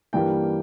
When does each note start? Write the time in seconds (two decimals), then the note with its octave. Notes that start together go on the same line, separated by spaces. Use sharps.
0.13 G2 E3 G3 A#3 G5